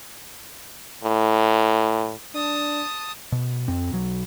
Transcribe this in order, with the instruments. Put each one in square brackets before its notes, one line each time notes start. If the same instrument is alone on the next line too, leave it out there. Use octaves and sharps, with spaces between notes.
[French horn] A2
[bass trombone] D4 [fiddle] A5 D#6
[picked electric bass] B2
F2 C4
B1 F#3